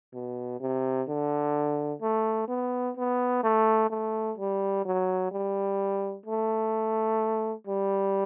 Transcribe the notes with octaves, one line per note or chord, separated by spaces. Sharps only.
B2
C3
D3
A3
B3
B3
A3
A3
G3
F#3
G3
A3
G3